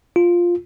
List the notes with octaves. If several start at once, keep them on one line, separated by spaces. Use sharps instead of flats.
F4